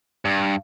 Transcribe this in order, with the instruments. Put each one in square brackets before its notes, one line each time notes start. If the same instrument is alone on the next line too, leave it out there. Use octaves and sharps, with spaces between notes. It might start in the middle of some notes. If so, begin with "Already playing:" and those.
[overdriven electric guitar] G2